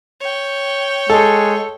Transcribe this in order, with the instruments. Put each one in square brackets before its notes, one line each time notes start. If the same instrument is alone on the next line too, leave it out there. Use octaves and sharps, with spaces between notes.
[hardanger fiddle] C#5 G5
[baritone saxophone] G#3 [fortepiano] A4